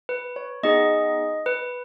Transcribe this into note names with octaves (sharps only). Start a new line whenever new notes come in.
B4
C#5
B3 D#4 G#4 D#5
B4